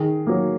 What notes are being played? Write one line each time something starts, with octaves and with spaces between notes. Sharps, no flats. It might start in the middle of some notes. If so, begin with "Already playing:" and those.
Already playing: D#3 G#4
F#3 A#3